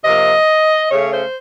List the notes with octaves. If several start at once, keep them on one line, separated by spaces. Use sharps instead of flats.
C3 F3 A#3 D#5
C#3 A3 C#4 C#5
C5